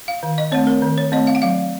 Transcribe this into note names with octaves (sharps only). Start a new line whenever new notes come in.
F5
D#3
D#5
A3 C4 C#5
A#4
D#3
C#5
A3 C4 D#5
F5
F#5
F#3 F5